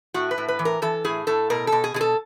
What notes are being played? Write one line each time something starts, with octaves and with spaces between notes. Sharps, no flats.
A2 F#4
B4
A2
B4
E3
A#4
E3 A4
A2 G#4
A2 A4
B2 A#4
A4
B2
G#4
B2 G#4
A4